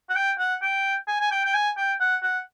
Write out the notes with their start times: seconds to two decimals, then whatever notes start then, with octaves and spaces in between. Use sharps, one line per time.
0.10 F#5
0.16 G5
0.39 F#5
0.62 G5
1.08 G#5
1.21 G#5
1.31 G5
1.45 G5
1.54 G#5
1.77 G5
2.00 F#5
2.23 F#5